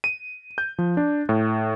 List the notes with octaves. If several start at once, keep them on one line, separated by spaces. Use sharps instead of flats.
D#7
G6
F3
D4
A2